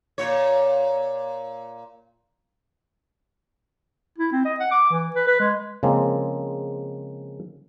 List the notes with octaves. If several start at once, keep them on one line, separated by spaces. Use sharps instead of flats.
A#2 C#5
E4
C4
D#5
F#5
D6
E3
B4
B4
G#3
C#3 F3 G#3 A#3 C4